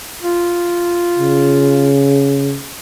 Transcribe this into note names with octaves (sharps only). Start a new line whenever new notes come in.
F4
C#3